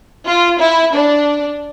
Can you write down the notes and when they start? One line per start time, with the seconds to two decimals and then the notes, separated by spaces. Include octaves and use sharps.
0.26 F4
0.60 E4
0.95 D4